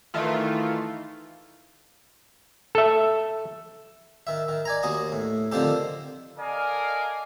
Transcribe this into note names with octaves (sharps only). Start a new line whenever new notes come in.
D#3 E3 A3 F4
A4 E5
D#3 E5
D#3
D5 G#5 A#5
D#2 F#4 D#6
A2
D3 D#3 F3 C4 G4 A4
A4 A#4 D5 D#5 F5 G#5